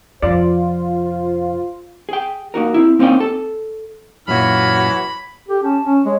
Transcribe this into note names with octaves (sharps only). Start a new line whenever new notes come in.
F2 C3 F4 C5 D5
G#4 G5
A#3 D#4 F#4 A#4
C4 E4
A#3 C4 C#4 D#4 D5 G5
A4
F#2 A#2 E3 F#4 C#5 B5 F6
G4 A4
C#4 A5
C#4
G#3 C#5